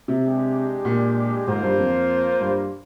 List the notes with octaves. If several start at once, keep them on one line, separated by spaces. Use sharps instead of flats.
C3
G#3 D4 G4
A#2
G#2 A#3 F4 C5
G2
F2
G2